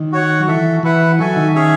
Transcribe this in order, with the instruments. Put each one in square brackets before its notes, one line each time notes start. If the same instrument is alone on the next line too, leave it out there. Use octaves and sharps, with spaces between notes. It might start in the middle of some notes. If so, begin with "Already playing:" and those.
Already playing: [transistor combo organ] D#3
[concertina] F#4 C#5 F#5
[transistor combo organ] F#3
[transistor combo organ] E3 [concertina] F#4 A4 E5
[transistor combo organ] E3 [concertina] E4 B4 F#5
[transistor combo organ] F#3 [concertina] F#4 A4 E5 G#5
[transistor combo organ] D#3
[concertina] C#4 G#4 C#5 E5